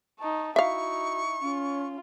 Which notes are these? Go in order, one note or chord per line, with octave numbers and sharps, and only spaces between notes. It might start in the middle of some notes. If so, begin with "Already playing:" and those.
D#4 A5 C#6
D#4 E4 F#4 E5 F5 C#6
C#4 F4